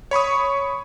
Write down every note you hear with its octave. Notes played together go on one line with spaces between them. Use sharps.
C#5 B5 C#6 D#6